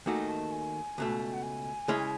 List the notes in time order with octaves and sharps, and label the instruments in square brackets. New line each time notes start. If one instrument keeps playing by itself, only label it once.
[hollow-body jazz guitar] D#2 D#3 A3 D#4 F#4 [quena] G#5
[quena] A5
G#5
[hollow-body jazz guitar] C#2 B2 A3
[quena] F#5
G#5
[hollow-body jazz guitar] C#3 G#3 C#4 E4 G#4